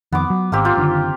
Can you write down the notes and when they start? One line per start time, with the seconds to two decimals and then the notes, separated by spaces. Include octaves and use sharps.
0.12 F2 D#3 B3 D6
0.30 F#3
0.52 G#1 A#3 C4 G4
0.65 F4 G5
0.77 F#1 D3 D#3